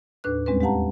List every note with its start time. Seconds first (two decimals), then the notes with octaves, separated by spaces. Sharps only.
0.24 D#2 A2 D4 B4 F#6
0.46 E2 G3 G#3 C4 C#4 B4
0.61 G#3 G4 F5 F#5 A5 A#5